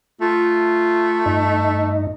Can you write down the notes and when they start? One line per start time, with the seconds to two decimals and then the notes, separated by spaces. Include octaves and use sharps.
0.21 A3 F4
1.26 G2 D#4 D#5